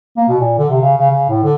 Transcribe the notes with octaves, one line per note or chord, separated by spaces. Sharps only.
A#3
B2
A#2
D3
C3
C#3
C#3
C#3
A2
D3